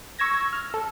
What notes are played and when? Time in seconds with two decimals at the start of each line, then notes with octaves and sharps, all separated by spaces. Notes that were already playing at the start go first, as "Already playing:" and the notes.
0.19 C#6 E6 G#6 A#6
0.53 F6
0.74 A4